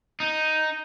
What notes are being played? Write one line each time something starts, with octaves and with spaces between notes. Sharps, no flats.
D#4